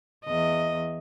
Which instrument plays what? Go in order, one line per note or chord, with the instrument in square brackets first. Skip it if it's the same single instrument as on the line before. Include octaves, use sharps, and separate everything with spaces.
[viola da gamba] E2 D#5